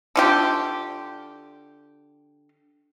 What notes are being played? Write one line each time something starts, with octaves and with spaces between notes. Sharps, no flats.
D3 F4 G4